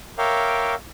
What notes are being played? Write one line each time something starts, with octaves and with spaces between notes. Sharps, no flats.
A#4 C#5 E5 F5 G5 D6